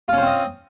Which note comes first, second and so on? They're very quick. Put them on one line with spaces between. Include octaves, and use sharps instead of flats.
F4 C#4 C5 C4 D#5